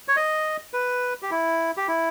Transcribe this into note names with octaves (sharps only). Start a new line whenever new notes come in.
C#5
D#5
B4
G4
E4
G4
E4